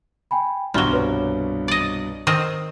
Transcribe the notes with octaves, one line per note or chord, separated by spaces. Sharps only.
G5 G#5 B5
C2 G2 B2 F3 F#3 C6 G7
B4 C#5
D5 D#5
D#3 C4 D#5